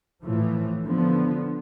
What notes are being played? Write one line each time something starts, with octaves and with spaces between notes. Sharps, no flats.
A2 E3 F3
D3 F3 B3